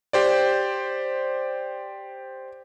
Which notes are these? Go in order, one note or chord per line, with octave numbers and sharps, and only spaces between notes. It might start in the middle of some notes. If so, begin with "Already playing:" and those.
G4 C5 D5